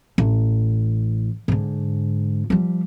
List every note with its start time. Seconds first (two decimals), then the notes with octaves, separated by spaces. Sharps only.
0.18 A1
1.48 G#2 D3
2.50 F3 G3